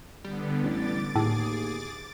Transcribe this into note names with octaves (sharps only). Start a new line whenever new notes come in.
D3 G3 B3
A1 D6 A6
D#2 A2 G#4